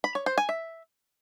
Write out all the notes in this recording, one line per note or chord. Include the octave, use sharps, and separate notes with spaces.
B5
C#5
C5
G#5
E5